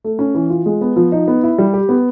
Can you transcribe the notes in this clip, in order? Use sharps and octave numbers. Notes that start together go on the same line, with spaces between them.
A3
C#4
E3
F4
G#3
B3
F3
D#4
B3
E4
G3
G4
B3